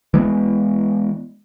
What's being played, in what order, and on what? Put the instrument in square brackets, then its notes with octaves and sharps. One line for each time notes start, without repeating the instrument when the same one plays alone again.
[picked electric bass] E3 G#3 A#3 B3